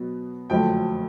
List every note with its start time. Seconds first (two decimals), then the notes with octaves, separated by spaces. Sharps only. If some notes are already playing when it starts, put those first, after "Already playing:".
Already playing: B2 F#3 B3
0.50 F#1 F2 D3 F#3 A3 G5